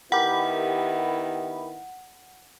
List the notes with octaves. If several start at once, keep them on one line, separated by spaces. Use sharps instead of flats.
D#3 B3 E4 G4 A#4 F#5 B5